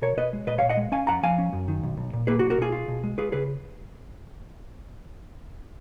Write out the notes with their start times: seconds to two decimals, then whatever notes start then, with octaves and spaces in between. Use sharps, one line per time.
0.02 B2 A#4 C#5
0.17 B2 B4 D#5
0.33 G#3
0.47 A#2 B4 D#5
0.58 C#5 F5
0.62 A#2
0.69 D#5 F#5
0.77 G#3
0.92 C#4 F5 G#5
1.07 F2 F#5 A#5
1.23 F3 F5 G#5
1.38 C#4
1.53 F#2
1.68 D#3
1.83 B1
1.97 B1
2.13 A#2
2.27 A#3 G#4 B4
2.39 F#4
2.43 B1
2.50 F#4 A#4
2.58 B2 F4 G#4
2.72 F4
2.88 B2
3.04 G#3
3.18 F4 G#4 B4
3.32 C#3 G#4 B4